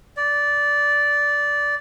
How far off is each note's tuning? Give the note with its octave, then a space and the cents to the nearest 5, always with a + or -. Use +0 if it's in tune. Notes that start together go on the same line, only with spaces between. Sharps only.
D5 -10